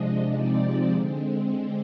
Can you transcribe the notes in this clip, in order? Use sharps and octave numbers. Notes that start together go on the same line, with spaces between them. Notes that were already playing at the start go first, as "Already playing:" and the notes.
Already playing: C3 F3 G#3 D4 D#5
C3 F3 G#3 C4 D#4 D5
D3 G#3 C4